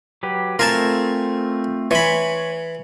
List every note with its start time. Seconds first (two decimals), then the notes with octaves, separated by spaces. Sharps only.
0.23 F#3 G4 B4
0.59 A3 C4 F4 A#4 G#5 A5
1.91 E3 C#5 G#5 B5 C6